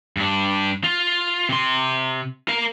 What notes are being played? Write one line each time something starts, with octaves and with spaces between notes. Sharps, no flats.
G2 D4
F4
C3 C6
A#4 F5